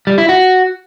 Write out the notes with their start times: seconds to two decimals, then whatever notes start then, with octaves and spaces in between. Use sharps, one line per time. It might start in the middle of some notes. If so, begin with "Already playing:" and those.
0.07 G3
0.18 E4
0.29 F#4